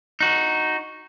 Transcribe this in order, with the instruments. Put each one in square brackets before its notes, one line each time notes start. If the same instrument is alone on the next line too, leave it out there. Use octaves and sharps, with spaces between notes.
[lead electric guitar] D#4 F#4